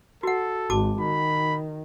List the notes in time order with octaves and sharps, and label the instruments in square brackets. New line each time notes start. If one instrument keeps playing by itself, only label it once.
[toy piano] F#4 F#5 [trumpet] A4
[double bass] G#1 [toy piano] F#4 A5 D6
[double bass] D#3 [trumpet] B5